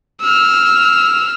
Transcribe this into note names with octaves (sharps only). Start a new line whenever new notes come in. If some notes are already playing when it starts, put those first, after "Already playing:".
E6 F6